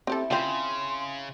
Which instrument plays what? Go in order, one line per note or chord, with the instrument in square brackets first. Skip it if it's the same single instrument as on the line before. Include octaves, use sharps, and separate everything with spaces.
[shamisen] C4 G4 A4 [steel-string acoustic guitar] E4
[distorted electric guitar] C#3 [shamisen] C4 F4 [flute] C6